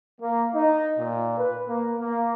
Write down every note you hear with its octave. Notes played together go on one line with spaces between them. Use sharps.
A#3
D#4
A#2
B4
A#3
A#3